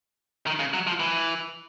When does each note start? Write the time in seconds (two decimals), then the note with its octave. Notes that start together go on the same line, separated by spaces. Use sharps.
0.47 D#3
0.59 C#3
0.73 F#3
0.87 F3
1.00 E3